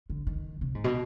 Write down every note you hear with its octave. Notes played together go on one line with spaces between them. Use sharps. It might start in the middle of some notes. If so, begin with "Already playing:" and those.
D3
D#3
C3
G#2
B2